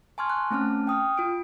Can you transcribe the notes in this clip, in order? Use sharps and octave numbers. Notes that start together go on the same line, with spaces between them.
G#5 A5 C6 C#6 F6 G#6
F#6
A3 C4 C#4 A5 F6
G5 D#6 F6
F4 D7